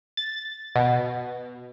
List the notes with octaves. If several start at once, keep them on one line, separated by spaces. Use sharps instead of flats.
A6
B2